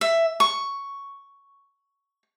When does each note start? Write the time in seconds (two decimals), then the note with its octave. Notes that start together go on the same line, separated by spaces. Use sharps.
0.01 E5
0.40 C#6